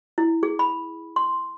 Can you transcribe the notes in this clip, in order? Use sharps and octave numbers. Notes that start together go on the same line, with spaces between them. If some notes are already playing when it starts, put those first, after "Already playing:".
E4
G#4
B5
C6